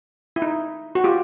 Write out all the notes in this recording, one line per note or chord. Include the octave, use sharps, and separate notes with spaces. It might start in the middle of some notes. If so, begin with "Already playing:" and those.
E4
D#4
F#4
F4 G4